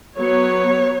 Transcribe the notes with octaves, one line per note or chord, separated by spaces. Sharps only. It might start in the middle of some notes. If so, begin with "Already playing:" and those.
F#3 B3 C#5